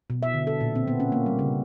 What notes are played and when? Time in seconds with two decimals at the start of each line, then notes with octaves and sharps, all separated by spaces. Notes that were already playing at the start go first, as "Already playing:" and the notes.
0.10 B2
0.23 E5
0.34 D3
0.47 A4
0.61 A#2
0.75 C4
0.88 B3
1.00 C#4
1.12 A#3
1.26 G3
1.39 C#3